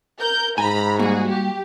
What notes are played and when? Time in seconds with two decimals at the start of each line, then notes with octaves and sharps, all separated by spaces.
0.18 A#4 G6
0.58 G#2 G#5 A#5 B5
0.99 G3 A#3 F#4 G#4
1.29 G4